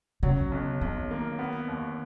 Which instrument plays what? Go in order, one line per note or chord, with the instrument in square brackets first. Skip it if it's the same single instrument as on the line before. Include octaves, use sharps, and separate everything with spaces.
[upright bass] C#3 [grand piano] F#3
[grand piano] B1
[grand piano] B1 [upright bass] D#3
[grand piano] A#3
B3
D#2